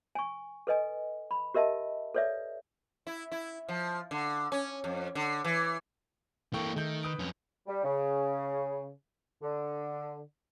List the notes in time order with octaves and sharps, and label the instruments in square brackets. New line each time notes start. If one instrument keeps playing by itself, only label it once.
[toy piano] G#5 C#6
A4 B4 D#5 G#5
B5
G4 A#4 D#5 E5 A5
A4 B4 C#5 D5 E5
[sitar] E4
E4
F3
D3
C#4
F2
D3
E3
[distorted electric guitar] E3 A#3 [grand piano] A4 G5 C#6
[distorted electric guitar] D#3 [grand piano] A3 G6
[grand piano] B4 D#6 D7
[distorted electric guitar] F2 C#4
[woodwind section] G3
C#3
D3